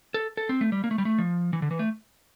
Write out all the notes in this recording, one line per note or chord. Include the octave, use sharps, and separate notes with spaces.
A4
A4
C4
A3
G3
A#3
A3
G3
A3
F3
E3
D3
E3
A3